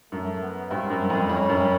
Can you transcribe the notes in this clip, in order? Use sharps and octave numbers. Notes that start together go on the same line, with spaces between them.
F#2 A3
B3
G2 C4
F#2
F2
F2 C#4
F#2